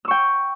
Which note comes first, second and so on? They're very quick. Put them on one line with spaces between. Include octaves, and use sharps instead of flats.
E6 C#6 G5